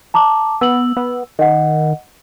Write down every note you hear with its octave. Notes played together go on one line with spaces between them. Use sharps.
A5 A#5 D6
B3 E6 F#7
B3
D#3 D#5 F#5